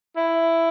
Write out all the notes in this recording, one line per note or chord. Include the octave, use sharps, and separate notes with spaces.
E4